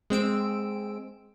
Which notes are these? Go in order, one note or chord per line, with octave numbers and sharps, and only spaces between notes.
G#3 C4 E6 D7